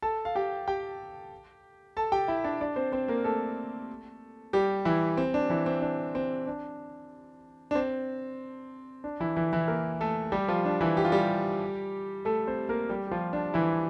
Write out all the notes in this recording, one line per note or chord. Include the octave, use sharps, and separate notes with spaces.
A4 A5
F5
G4 G5
G4 G5
A4 A5
G4 G5
E4 E5
D4 D5
D4 D5
C4 C5
C4 C5
A#3 A#4
A3 A4
G3 G4
E3 E4
C4
D4
E3 E4
C4
D4
C4
D4
D4
C4
D4
E3 E4
E3 E4
E3 E4
A#3 A#4
A3 A4
G3 G4
F3 F4
D4
E3 E4
G4
F4
G3 G4
A3 A4
C4 C5
A#3 A#4
G3 G4
G4
F3 F4
D4
E3 E4